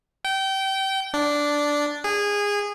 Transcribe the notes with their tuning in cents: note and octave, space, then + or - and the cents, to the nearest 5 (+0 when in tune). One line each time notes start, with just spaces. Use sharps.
G5 -25
D4 -5
G#4 -20